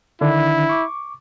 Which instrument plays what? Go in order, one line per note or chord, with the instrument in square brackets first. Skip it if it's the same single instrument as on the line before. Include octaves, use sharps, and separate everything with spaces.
[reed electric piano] D3 D#3 D4 [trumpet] E4
[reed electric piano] C#6 D6